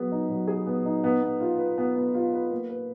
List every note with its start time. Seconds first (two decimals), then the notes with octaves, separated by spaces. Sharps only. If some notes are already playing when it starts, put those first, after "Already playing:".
Already playing: F#3 B3 G#4
0.12 D#4
0.29 F#3
0.47 G#4
0.67 B3
0.86 D#4
1.04 B3
1.22 B3
1.40 F4
1.59 B4
1.78 B3
1.96 B3
2.14 F4
2.33 B4
2.51 A#3
2.69 B4